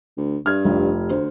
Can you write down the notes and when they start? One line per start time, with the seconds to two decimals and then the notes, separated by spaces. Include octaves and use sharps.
0.17 D2
0.46 G2 F6 G#6
0.65 F1 F4 G4
1.10 D2 C5